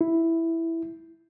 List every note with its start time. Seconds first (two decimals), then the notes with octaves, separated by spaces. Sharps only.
0.01 E4